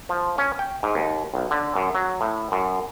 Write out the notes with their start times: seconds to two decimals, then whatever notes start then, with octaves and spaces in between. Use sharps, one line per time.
0.09 F3
0.38 C#4
0.59 G5
0.83 G#2
0.95 D#2
1.34 B1
1.51 D3
1.76 F#2
1.95 F#3
2.21 A2
2.52 F#2